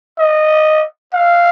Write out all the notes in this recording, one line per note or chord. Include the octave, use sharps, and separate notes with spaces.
D#5
F5